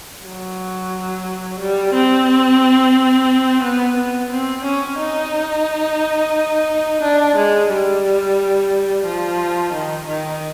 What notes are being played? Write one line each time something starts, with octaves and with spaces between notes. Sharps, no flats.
F#3
G3
C4
B3
B3
C4
C#4
D#4
D4
G#3
G3
F3
D#3
D#3